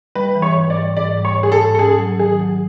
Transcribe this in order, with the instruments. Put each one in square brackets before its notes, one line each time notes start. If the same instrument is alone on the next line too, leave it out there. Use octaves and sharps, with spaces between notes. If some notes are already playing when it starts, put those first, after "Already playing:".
[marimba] G3 [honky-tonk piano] B4
[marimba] E3
[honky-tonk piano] C#5
[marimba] G#2
[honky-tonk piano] D5
[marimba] G3
[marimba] G#2 [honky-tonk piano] D5
[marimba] G3
[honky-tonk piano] C#5
[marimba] G#2 [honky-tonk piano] G#4
[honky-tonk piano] A4
[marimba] G#2
[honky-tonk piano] A4
[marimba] C#4 [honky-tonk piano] G#4
[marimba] F#3
[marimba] D#3 [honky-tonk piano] G#4
[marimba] F#3